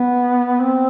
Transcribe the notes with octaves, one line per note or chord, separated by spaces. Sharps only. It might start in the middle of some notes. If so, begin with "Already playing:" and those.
Already playing: B3
C4